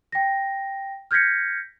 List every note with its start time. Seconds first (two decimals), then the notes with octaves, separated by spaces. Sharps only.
0.12 G5 A#6
1.11 F6 G6 G#6 A#6 B6 C#7